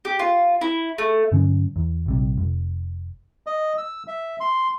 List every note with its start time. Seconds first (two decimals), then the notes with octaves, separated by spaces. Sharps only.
0.05 G4
0.19 F4
0.61 E4
0.98 A3
1.32 G2 D3 F#3 C#4
1.76 E2
2.06 A#1 C3 G3
2.38 F1
3.46 D#5
3.78 E6
4.07 E5
4.40 C6